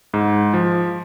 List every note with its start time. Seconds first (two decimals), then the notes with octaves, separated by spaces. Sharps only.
0.14 G#2
0.54 F3